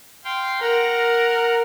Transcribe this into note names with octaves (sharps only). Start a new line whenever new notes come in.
F5 G5 C6
A#4 F#5 A#5